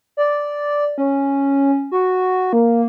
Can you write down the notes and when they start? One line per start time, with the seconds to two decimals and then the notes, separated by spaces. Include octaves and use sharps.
0.17 D5
0.98 C#4
1.92 F#4
2.53 A#3